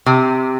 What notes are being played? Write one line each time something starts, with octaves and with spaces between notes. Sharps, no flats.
C3